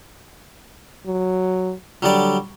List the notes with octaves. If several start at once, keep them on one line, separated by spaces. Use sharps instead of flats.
F#3
D3 F#3 G3 D5